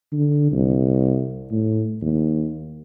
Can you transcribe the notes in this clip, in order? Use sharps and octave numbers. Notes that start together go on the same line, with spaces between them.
D3
C2
A2
D#2